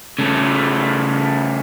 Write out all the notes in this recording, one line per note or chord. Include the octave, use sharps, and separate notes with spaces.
C#3 A3